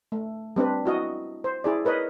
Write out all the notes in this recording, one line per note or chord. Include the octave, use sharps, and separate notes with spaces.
A3
G3 C4 D4 B4
E4 F#4 D#5
C5
E4 G#4 D5
A#4 B4 C#5 D#5